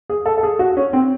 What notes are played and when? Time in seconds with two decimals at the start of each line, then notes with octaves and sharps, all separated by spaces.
0.10 G#4
0.26 A4
0.38 A4
0.43 G#4
0.59 F#4
0.77 C#4
0.93 C4